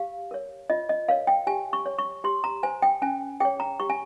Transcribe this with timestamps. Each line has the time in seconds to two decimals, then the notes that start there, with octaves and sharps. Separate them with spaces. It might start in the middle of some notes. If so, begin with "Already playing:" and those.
Already playing: G4 F5
0.31 A#4 C#5
0.70 F4 D#5
0.89 D#5
1.08 A#4 C#5 F5
1.27 G5
1.47 G4 G#5
1.73 C#6
1.86 C#5
1.98 C#6
2.24 G4 C6
2.44 A#5
2.63 C5 G#5
2.82 G5
3.02 C#4 G#5
3.40 G#4 C#5 G5
3.60 A#5
3.80 G4 C#6
3.90 G#5